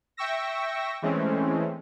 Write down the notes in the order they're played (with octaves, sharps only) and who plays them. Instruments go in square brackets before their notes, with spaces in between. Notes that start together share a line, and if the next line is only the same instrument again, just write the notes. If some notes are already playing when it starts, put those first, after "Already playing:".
[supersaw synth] E5 G5 C#6 E6 A#6
E3 G#3 A3 C4 C#4